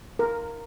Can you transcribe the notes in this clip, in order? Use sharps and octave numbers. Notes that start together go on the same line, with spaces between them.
A#4